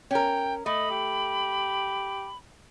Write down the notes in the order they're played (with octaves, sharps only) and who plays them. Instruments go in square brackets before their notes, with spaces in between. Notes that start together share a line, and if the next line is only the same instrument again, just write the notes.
[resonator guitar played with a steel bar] C#4 A#4 [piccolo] G5
[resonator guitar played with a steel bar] A3 [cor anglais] D#5 [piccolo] B5
[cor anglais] G4